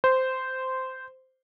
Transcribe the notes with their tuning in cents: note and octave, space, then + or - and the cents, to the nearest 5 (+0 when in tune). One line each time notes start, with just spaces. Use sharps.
C5 -10